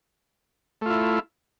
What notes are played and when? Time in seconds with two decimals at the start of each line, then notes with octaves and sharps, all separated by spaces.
0.81 A3
0.86 F4
0.90 E4